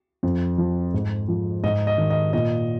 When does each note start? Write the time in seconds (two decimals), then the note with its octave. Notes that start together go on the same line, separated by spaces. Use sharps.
0.23 F2
0.58 F3
0.94 G#2
1.28 F3
1.64 G#2 D#5
1.87 D#5
1.98 D#3
2.10 D#5
2.33 A#2 D#5